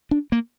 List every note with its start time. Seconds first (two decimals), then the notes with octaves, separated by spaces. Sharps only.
0.11 D4
0.32 A#3